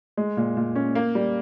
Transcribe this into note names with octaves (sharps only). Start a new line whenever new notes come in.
G#3
A#2
A#2
C#4
A#3
G3